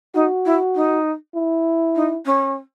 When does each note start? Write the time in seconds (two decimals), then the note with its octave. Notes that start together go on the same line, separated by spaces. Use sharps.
0.14 D#4 F#4
0.45 E4
0.75 D#4
1.35 E4
1.96 D#4
2.25 C#4